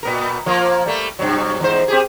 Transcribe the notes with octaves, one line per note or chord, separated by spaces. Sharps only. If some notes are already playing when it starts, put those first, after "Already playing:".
A#2 B3 A#4
F3 A#3 F4
G3 A3 A#3
G2 C3 F#3
E2 G#2 C5
C4 G4 G#4